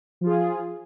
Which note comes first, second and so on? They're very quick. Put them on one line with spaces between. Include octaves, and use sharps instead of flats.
F3 F4 G#4